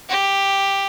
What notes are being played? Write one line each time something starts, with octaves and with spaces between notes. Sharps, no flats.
G4